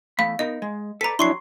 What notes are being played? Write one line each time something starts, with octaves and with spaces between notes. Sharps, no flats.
E2 A3 F5 B5
B3 D#4 A#4 D#5
G#3
A4 B4 D5 A#5 B6
F2 F#3 D4 E4 C6 C#6 C7